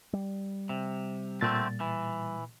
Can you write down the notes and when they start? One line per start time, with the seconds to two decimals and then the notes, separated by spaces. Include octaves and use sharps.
0.13 G3
0.69 C3
1.41 A#2 D3 A3 C4 A6
1.81 E3